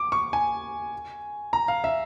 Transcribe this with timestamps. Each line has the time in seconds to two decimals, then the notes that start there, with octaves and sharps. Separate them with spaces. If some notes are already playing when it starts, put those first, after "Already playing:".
Already playing: D6
0.12 C#6
0.33 G#5
1.53 A#5
1.68 F5
1.84 E5